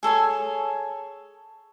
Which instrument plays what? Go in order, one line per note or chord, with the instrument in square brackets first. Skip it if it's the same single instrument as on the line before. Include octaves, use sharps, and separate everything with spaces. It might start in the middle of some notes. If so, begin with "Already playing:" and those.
[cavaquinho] G#4 A4 C#5 G#5